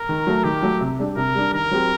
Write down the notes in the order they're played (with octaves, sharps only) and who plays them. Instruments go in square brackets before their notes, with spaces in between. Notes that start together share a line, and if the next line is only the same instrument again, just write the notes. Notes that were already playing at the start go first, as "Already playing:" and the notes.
Already playing: [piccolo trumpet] A#4
[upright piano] D#3
F#3 A3
[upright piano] D#3 [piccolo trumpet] G4
[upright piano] F#3 A3
C3
G3 D4
[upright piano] C3 [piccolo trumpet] A#4
[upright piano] G3 D4
[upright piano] D#3 [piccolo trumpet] A#4
[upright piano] F#3 C4 G4